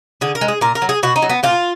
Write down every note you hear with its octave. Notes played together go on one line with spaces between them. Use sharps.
D3 G#4
A#4
G#3
G#4
A#2 A#4
A#4
F#3
G#4
B2 F#4
D#4
F#3
B3
A#2 F4